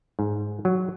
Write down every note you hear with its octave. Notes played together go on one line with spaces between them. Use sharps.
G#2
F#3